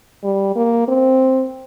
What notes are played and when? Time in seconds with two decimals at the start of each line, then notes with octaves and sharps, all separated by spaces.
0.24 G3
0.56 A#3
0.88 C4